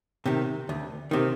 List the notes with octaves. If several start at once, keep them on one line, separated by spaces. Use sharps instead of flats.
C3 D#3
D2
C3 D#3